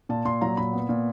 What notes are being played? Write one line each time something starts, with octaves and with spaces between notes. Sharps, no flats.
A#2 A5
A#2 C6
F#3 A#5
A#2 B5
B3
A#2